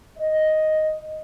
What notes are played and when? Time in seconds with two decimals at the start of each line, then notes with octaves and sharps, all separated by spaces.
0.18 D#5